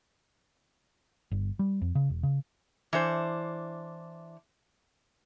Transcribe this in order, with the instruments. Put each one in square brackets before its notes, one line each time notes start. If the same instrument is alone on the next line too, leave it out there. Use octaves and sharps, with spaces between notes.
[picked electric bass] G1
G3
F2
C#3
E1
C#3
[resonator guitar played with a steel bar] E3 D4 C5